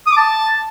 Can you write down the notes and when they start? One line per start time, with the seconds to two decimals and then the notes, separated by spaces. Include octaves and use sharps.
0.06 D#6
0.12 D6
0.17 A5